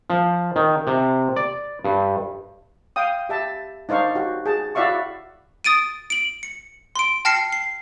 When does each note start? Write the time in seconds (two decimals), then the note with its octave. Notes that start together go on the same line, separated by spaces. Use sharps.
0.10 F3
0.56 D#3
0.87 C3
1.36 D5
1.85 G2
2.96 F5 G5 D#6
3.29 G4 E5 A5
3.89 D4 D#4 C5 F5 C#6
4.15 F#4 G4
4.46 G#4 A5
4.75 E4 F#4 D5 E5 F5 C#6
5.64 D#6 A6 D7 D#7
6.10 D7 F#7
6.43 C#7
6.96 C6 D7
7.25 G5 A5 F6 A#6 C7 C#7
7.52 C7